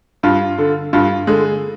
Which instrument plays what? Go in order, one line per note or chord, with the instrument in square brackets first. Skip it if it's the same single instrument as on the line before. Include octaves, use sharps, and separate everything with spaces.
[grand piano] G2 F4
D3
G2 F4
D3 G#3